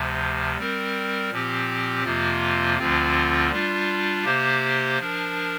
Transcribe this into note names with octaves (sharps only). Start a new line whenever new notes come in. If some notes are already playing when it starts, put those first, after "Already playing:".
Already playing: D2 C3 F3
G3 C4 A#4
A#2 F3 C4 G4
F2 C3 F3 A#3 F4
D2 D3 F3 C4 F4
G3 D4 F4
C3 A#3 G4 C5
F3 D4 A#4